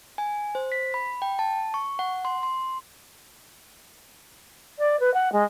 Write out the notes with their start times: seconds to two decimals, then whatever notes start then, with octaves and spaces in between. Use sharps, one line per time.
0.18 G#5
0.55 C5
0.72 B6
0.94 B5
1.22 G5
1.39 A5
1.74 C#6
1.99 F#5
2.25 C6
2.43 C6
4.79 D5
5.00 B4
5.14 F#5
5.32 G#3